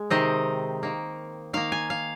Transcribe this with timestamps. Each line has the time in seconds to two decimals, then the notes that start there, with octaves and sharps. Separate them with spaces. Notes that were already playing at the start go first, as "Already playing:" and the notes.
Already playing: G#3
0.10 C3 D#3 C4 D#5
0.83 D#3 A#3
1.53 D#3 A#3 F5
1.72 G#5
1.90 F5